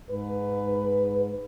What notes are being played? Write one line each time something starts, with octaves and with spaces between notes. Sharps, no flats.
G#2 B4